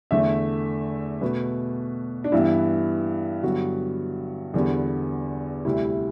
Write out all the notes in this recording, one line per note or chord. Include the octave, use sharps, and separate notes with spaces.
E2 D3 A3 E5
B2 A3 B4
D4
G2 E3 B3 E4
G2 D3 F#3 B3 F#4
E2 D3 G3 B3
D2 C3 G3 E4